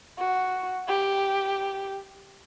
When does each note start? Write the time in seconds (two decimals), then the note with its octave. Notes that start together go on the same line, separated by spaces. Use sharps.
0.18 F#4
0.88 G4